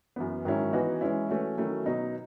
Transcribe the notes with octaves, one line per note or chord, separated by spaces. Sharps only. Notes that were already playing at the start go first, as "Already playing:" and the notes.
F#2 E3 B3
G#2 D#3 F#3 C#4 E4
E3 B3 D#4 F#4
E3 G#3 C#4 E4
E3 A3 C#4 F#4
D#3 F#3 A3 C#4 E4
B2 F#3 B3 D#4